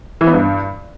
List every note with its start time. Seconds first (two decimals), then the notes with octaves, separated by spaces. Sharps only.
0.21 E3
0.27 B3
0.34 G2